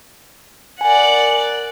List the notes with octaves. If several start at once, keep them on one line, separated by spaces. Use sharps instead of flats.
A#4 D5 F#5 G#5